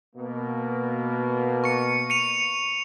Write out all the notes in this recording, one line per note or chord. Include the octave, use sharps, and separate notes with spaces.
B2 A#3
C#6 C#7
C#7 D#7 F7